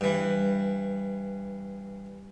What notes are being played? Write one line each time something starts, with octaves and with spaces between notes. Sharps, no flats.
G2 E3